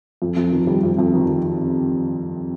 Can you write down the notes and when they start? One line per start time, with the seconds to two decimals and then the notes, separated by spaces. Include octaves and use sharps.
0.22 F2
0.37 F2
0.52 D#3
0.67 G3
0.83 F2
0.99 F2
1.14 D#3